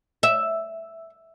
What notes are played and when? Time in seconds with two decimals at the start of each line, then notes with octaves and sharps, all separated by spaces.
0.23 E5